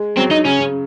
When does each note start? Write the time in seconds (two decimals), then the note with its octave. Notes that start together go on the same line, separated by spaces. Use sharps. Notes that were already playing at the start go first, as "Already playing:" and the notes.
Already playing: G#3
0.17 F#3 C4
0.31 D#4
0.45 C#3 C#4
0.59 C#3